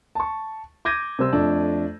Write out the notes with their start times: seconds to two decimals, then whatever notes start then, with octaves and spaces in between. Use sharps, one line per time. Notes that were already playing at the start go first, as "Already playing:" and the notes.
0.15 A5 C#6
0.85 D6 G6 G#6 A#6 D#7
1.19 C3 G3 C5 E6
1.33 F2 A3 D4